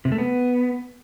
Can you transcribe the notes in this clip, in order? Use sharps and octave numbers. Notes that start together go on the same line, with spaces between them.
C3
A3
B3